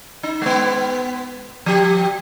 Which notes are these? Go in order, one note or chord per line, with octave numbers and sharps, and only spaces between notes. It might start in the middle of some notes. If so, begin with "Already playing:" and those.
D#4
G#3 B3
F3 G4